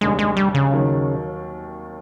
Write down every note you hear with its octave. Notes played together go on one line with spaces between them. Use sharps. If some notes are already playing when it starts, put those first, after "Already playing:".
F1 D#2 D3 G3 G#3
G#3
G3
C#3
D#2 D#3 F#3